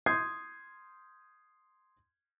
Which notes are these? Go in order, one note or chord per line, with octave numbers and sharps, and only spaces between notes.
C6 D#6 G6 G#6 C7